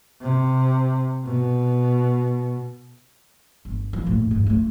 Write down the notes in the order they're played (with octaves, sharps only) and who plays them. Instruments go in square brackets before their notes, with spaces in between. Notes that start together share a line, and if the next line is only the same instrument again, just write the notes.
[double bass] C3
B2
[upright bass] G1
F3
D#2 A2
G2
A3 F4